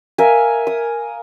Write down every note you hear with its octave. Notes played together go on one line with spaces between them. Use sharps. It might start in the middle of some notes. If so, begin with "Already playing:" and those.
A#4 E5 F5 G#5
D#6